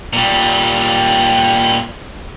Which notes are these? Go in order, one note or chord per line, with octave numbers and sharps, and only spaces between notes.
A#2 G3